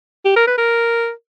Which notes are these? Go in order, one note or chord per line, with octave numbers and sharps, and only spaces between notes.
G4
A#4
B4
A#4